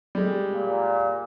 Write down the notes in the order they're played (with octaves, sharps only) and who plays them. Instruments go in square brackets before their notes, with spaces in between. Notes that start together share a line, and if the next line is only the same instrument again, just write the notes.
[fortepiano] G3 G#3
[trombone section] A#2